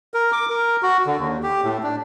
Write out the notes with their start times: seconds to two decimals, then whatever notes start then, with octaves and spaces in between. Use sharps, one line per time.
0.14 A#4
0.32 D6
0.50 A#4
0.83 F#4
1.07 D3
1.19 D#2
1.43 G4
1.64 A2
1.83 D4